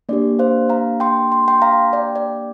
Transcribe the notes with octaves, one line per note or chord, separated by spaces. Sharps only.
A#3 D4 G4 D5
C5 F5
F5 A#5
G5 C6
C6
G5 C6
F5 A#5
D5 G5
D5